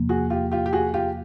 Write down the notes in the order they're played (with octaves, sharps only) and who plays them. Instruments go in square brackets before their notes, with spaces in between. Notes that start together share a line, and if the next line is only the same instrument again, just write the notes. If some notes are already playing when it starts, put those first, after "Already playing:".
Already playing: [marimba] E2 C3 F3 A#3
[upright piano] F#4 G#4
F4 G4
F4 G4
G4
F#4 G#4
F4 G4